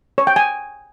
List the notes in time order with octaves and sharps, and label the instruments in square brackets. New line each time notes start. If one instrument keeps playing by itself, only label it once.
[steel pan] C#5
G5
G#5